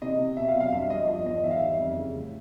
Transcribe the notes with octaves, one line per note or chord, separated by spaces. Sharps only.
C3 D#5
C3
B2 E5
F5
F#3
F5
G2 E5
G2 D#5
F3 D#5
E2 D#5
D#3 E5
F5
G3 E5
F2
C#3
A2